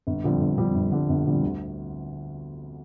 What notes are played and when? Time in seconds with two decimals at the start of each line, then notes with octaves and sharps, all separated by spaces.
0.07 G1
0.24 F2 D3 G3
0.41 G1
0.58 F2 D3 G3
0.75 G1
0.92 F2 D3 G3
1.09 G1
1.26 F2 D3 G3
1.43 D2